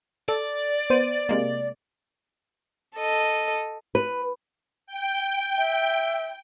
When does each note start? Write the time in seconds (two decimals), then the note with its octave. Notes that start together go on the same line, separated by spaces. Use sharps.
0.29 A4 D5
0.90 B3 C5 D#7
1.29 C3 G#3 A#3
2.96 A4 D#5
3.95 B4
4.87 G5
5.58 E5